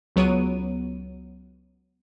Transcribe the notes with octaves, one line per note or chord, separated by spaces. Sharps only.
C#2 F#3 B3 C#5 D7 D#7